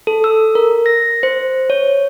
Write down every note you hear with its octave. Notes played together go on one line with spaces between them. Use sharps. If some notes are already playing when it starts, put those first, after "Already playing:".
A4
E6
A#4
A#6
C5
C#5